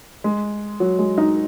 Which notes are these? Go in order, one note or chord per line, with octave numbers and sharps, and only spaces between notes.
G#3
F#3
G#3
D#4